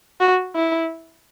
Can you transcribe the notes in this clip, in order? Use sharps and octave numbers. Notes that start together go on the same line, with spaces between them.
F#4
E4